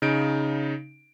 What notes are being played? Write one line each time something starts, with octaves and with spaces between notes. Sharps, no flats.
C#3 D#4 D7